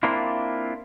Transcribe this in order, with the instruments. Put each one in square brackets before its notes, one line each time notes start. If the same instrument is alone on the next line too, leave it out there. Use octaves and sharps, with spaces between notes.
[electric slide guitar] A#3 C4 D4 E4 F4